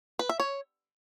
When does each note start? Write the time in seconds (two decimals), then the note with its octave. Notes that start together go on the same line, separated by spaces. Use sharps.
0.19 B4
0.29 E5
0.40 C#5